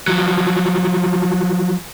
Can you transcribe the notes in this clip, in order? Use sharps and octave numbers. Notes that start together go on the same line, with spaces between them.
F3 F#3